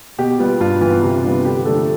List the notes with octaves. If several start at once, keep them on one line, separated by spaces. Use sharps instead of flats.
B2 G4
G3 B3 F4
G2 F4
E3 B3 F4
C3 F4
G3 B3 D4
D3 G4
F3 A3 D4 A4